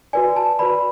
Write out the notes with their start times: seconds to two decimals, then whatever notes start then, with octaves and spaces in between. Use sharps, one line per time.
0.13 F#4 B4 D5 G#5
0.36 A5
0.59 F#4 B4 D5 B5